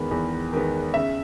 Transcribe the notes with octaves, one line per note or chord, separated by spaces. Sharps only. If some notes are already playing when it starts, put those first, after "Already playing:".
Already playing: E2 D#3 G#3 B3 B5
E2
D#3 G#3 B3
C#3 E5